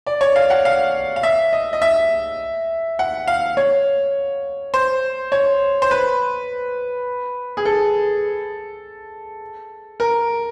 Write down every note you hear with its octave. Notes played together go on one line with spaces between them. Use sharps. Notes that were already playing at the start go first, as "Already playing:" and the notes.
D5
C#5
F5
F#5
F5
F5
E5
D#5
D#5
E5
F#5
F5
C#5
C5
C#5
C5
B4
G#4
A4
A#4